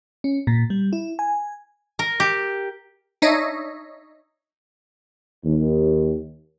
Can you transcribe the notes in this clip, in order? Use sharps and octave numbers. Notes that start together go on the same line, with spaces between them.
C#4
A#2
G3
E4
G#5
A#4
G4
D4 D#4 C#5 D#5 E5
D#2